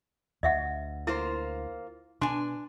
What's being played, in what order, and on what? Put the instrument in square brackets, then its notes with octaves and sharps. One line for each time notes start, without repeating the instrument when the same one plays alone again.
[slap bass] D2 [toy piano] D#5 E5 F#5
[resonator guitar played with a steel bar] A#3 F4 C5 [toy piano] E4
[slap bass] B2 [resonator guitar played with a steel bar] D4 G#5 [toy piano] C6